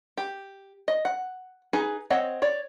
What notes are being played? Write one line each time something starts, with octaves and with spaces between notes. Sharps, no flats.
G4
D#5
F#5
D#4 G#4 B4 G#5
C4 C#5 D#5 F#5
C#5 D5